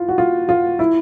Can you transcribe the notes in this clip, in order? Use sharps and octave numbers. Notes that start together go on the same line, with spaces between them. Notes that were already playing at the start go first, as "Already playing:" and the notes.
Already playing: E4 F4
F#4
F4
F4
E4